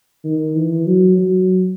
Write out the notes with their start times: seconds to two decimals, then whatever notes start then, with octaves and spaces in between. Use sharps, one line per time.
0.24 D#3
0.55 E3
0.86 F#3
1.18 F#3